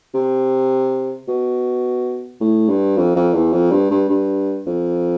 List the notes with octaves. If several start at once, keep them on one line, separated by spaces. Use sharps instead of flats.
C3
B2
A2
G2
F2
F2
E2
F2
G2
G2
G2
F2